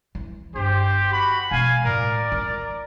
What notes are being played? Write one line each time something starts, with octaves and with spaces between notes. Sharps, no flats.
E3
G1 G4 C5
F#4 B5
B2 G#3 F5 G#5
A2 A#4 D5
F4 A#4